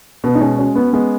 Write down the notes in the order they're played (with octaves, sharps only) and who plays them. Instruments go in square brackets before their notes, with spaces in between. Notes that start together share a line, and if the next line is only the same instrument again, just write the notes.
[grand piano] B2 [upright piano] B3
[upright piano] D#4
[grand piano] G#3 [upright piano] C#4
[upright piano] C#4 [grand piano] F#4
[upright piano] B3 [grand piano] C#4
[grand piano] G#3 [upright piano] B3